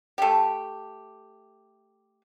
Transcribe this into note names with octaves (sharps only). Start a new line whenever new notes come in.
A3 G4